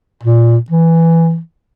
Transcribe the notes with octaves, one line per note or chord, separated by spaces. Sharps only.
A#2
E3